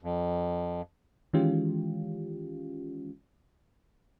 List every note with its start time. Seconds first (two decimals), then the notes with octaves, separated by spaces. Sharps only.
0.02 F2
1.33 D#3 E3 G#3 C#4 F4 G4